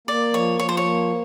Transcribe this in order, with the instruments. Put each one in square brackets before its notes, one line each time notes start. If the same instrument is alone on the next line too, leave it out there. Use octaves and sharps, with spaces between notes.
[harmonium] A#3 [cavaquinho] D5
[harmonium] F3 [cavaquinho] C#5
[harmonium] F3 [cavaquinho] C#5
[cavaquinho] C5
C#5
[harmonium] A#3